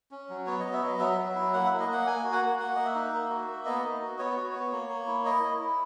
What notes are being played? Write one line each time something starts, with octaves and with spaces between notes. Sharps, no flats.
C#4
F#3
B3 C#5
B3 D#5
E5
F#3 D#5
F#3 E5
F#3
E4
A#3 F#5
A#3 E5
D#5
A#3 F#5
A#3 G#5
F#4
F#5
A#3
A#3 F#5
A#3 D#5
E5
D#4
A#3
F#4
A#3
B3 D#5
D#4
F#4
B3 C#5
F#4
B3
A#3
A#3
E4
E4 D#5
E4
E4